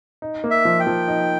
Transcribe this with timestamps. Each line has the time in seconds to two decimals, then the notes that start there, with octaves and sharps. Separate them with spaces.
0.22 D#4
0.44 A#3
0.51 E5
0.65 F3
0.80 G5
0.87 F3
1.08 D#4